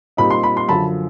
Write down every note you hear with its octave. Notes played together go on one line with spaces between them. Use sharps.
A#2 G3 C4 D#4 B5
C6
B5
C6
F#2 D3 F3 A5 B5